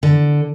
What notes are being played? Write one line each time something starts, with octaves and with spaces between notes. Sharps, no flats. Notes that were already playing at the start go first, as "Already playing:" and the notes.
D3